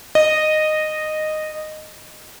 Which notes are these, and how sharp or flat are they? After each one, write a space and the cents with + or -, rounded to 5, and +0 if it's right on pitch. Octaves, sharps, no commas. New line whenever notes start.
D#5 -10